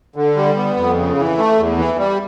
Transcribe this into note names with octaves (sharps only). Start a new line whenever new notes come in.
D3
G3
B3
F2
C#3
E3
A3
E2
E3
G3